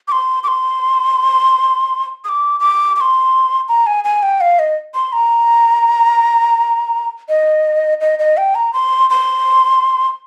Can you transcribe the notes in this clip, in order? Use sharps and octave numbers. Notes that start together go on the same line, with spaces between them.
D6
C6
D6
C6
D#6
D6
D6
D6
C6
A#5
G#5
G#5
G5
F5
D#5
C6
A#5
D#5
D#5
D#5
G5
A#5
C6
C6